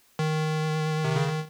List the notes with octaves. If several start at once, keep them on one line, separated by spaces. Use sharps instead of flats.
D#3
C3
C#3
D#3